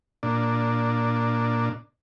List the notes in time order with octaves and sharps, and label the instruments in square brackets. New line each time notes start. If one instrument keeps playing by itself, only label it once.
[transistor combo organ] A#2 D4